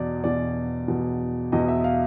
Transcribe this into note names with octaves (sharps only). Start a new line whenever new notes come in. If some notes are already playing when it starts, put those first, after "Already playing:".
Already playing: E2 B2 D5
E2 B2 D5
E2 B2
E2 B2 D#5
E5
F5